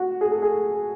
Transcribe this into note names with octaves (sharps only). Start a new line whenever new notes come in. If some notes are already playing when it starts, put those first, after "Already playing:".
Already playing: F#4
G#4
A4
G#4